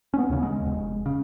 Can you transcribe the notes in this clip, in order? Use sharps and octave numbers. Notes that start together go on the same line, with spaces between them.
C#4
B3
D#2 C#3
G#3
F1
C#3